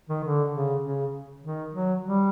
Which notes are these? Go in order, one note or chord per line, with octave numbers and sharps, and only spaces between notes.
D#3
D3
C#3
C#3
D#3
F#3
G3